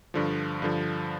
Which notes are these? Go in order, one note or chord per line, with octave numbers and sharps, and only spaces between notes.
G2 D3 F3
G2 D3 F3